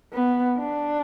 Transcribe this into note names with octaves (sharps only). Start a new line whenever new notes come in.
B3
D4